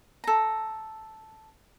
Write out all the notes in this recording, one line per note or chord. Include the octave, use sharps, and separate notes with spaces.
A4 A#5